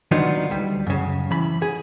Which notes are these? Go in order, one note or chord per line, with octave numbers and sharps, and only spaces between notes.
D#3 F#3 B3 D4 D#4 F4
D2 G3
F#2 C#3
E3 B5
G#4